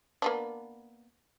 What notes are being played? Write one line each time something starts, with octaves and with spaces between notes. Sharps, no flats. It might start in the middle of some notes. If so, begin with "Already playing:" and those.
A#3 B3 D4